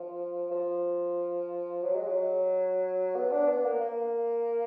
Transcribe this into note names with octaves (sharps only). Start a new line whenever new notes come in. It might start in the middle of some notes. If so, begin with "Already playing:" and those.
Already playing: F3
F3
F#3
G#3
F#3
B3
D4
B3
A#3
A#3